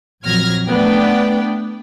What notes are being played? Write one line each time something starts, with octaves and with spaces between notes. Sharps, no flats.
A#1 F2 F#3 F6 G#6 A#6
A3 B3 D4 D5 G5